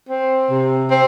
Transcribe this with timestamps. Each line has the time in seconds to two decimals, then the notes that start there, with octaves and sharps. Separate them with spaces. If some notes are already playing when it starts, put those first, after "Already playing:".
0.09 C4
0.49 C3
0.90 C4